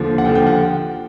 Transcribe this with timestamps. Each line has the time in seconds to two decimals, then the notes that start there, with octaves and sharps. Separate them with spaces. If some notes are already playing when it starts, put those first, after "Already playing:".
Already playing: D#2 D3 F3
0.18 F#5
0.24 D#2 D3 F3 G5
0.35 G5
0.47 F#5